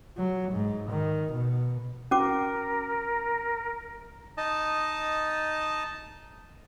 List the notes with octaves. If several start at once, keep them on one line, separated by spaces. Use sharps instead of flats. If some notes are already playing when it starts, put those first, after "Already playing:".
F#3
G#2
D#3
B2
C#4 F#4 A#4 D6
D#4 D#5 A5